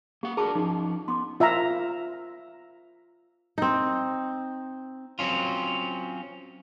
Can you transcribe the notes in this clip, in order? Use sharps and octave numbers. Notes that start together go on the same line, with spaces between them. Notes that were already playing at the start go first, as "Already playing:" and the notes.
A#3 G4 F#5
D4 F#4 G#4 A#4 A5 D6
F3 C#4 D#4
B3 C6 D6
F4 E5 F5 A#5
C4 D#4
F#3 C4 C#4 F4